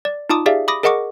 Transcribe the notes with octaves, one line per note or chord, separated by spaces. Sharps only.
D5
D#4 F4 A5 D6 D#6
G4 G#4 D5 E5 F5
B5 D6 D#6 A#6
G#4 A#4 D#5 F#5 C#6 D6